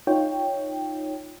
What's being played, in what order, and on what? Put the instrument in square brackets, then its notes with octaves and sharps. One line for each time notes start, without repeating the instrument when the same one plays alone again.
[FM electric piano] D#4 F4 C#5 G5